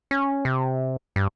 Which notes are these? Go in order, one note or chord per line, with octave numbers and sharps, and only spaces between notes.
C#4
C3
G2